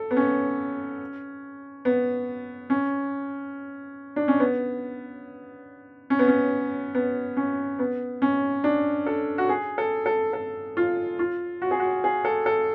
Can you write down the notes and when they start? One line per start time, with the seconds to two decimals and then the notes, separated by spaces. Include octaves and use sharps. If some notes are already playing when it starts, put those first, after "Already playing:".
Already playing: A4
0.11 B3
0.17 C#4
1.85 B3
2.70 C#4
4.16 D4
4.28 C#4
4.40 B3
6.10 C#4
6.19 B3
6.28 C#4
6.95 B3
7.37 C#4
7.79 B3
8.22 C#4
8.64 D4
9.06 A4
9.38 F#4
9.49 G#4
9.78 A4
10.06 A4
10.33 A4
10.77 F4
11.19 F4
11.62 F#4
11.71 G#4
11.80 F#4
12.04 G#4
12.25 A4
12.46 A4